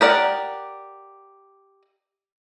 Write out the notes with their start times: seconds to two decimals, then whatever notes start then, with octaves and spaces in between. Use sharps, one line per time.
0.01 G4 A#4 D5 F#5